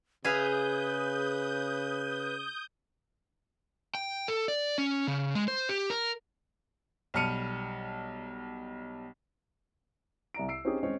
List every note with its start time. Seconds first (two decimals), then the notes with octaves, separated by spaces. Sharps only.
0.25 C#3 G#4 B4 E5 F5 D#6 G6
3.95 G5
4.28 A4
4.48 D5
4.78 C#4
5.07 C#3
5.35 G#3
5.48 C5
5.69 G4
5.90 A#4
7.14 B1 G3 A5 F6 C#7 D#7
10.34 C2 D5 A#5 D7
10.48 E6 C7 D7
10.65 C4 C#4 D#4 G4 G#4
10.83 G#3 C4 C#4 C#5